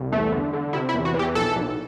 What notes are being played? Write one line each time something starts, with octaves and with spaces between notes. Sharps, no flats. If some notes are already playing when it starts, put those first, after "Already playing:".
Already playing: C2
E2 A3
D3
D3
C3 E4
E4
E2
F#4
E3
G4
B1 A4
B1